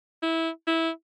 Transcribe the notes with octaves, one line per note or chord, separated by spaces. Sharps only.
E4
E4